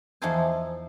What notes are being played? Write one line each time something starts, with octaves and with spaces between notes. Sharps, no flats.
E2 F3 D#4 A4 C5 G#5